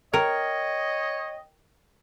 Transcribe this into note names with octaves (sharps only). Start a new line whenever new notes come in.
A#4 C#5 D#5 G5